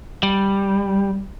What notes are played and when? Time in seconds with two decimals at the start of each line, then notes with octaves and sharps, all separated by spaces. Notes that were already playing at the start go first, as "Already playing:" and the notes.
0.23 G3